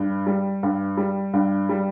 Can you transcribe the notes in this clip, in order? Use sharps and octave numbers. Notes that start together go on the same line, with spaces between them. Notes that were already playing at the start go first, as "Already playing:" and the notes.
Already playing: G2
G3
G2
G3
G2
G3